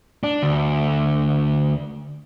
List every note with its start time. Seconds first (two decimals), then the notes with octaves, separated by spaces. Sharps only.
0.23 D4
0.43 D2